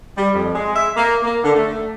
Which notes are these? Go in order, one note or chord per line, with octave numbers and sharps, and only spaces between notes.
G3
F2
G#3
E5
A#3
A#3
D3
A3